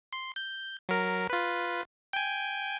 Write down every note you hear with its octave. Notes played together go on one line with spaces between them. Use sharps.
C6
G6
F#3 A#4
F4 B4
G5 G#5